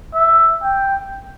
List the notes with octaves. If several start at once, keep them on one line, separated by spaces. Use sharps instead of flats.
E5
G5